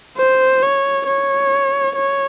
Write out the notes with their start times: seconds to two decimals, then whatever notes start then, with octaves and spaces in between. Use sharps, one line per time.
0.17 C5
0.63 C#5
1.07 C#5
1.96 C#5